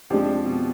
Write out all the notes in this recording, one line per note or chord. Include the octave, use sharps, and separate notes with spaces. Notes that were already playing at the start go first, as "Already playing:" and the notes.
F2 F3 G#3 D4 G4
B2